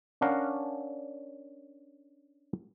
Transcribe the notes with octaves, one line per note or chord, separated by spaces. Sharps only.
C#4 D4 A#4 F5 F#5 A#5